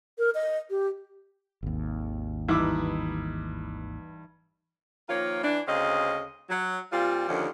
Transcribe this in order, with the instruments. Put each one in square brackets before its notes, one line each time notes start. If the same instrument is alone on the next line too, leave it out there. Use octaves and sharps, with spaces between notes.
[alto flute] A#4
D#5
G4
[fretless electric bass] G#1 D#2
[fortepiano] G2 D6 E6 [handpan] E3 D#4 [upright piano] E4
[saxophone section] D#3 F3 A#3 F4 C#5
E3 D4
D2 C#3 C4 D#5 F5
F#3
A#2 G3 C4 F4
D#2 D3 D#3 F3 C#4